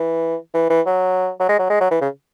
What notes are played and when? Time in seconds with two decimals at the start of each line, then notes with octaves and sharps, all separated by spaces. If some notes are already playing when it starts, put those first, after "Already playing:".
Already playing: E3
0.54 E3
0.70 E3
0.86 F#3
1.40 F#3
1.49 G#3
1.59 F#3
1.70 G#3
1.80 F#3
1.91 E3
2.01 C#3